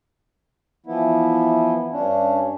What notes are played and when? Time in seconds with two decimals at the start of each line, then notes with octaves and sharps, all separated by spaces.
0.86 E3 F3 B3 E4
1.92 G2 C#4 D4